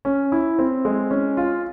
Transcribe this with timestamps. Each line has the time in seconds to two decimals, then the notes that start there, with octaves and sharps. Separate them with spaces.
0.05 C#4
0.32 E4
0.59 C4
0.85 G#3
1.11 C#4
1.37 F4